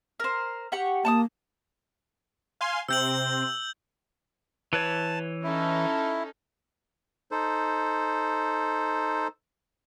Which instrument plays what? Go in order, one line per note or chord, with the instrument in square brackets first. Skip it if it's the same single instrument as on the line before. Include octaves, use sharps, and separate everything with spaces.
[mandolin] A#4 C5
G4 F#5 C#6
[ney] A#3 [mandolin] A5 C#6 D#6
[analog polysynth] F5 G#5 C6
[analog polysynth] C3 C4 [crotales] E6 G6 F#7
[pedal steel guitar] E3 B4 C#5 [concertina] A5
[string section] C#4 D#4 A4 [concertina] E4
[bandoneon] D#4 A4 C5